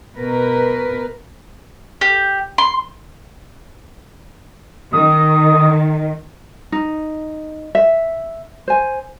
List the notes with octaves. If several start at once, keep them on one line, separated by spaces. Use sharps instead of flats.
B2 A#4 B4
G4
C6
D#3 D#6
D#4
E5
C5 G#5